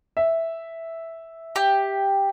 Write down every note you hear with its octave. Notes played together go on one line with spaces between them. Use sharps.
E5
G4